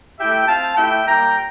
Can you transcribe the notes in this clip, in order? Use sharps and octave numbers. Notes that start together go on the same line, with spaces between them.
A3 E4 G4 E5 G5
C4 F4 F5 A5
A3 E4 G4 E5 G5
G3 A#3 F4 G5 A#5